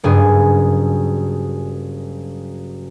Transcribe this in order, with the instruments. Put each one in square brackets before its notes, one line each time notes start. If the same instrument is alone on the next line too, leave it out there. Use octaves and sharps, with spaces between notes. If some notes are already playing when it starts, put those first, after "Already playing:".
[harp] F#1 G2 G#4